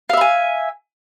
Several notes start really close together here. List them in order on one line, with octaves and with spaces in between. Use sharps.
F5 E5 B5 G#5